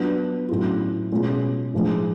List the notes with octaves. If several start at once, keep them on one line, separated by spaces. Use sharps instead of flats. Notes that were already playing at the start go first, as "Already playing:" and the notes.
Already playing: F#3 B3 D4 F4
A2 F#3 C#4 F4
B2 G#3 C#4 F4
A2 F3 G#3 D4